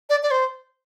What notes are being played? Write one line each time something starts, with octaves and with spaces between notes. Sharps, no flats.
D5
D5
C5